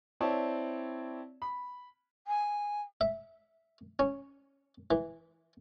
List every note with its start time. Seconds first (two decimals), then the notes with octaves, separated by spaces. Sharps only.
0.21 C4 E4 C#5 D5 A5
1.42 B5
2.27 G#5
3.01 E5
3.99 C#4
4.91 E3